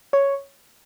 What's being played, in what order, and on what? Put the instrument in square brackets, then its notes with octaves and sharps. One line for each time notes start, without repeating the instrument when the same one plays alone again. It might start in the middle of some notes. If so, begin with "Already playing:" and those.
[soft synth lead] C#5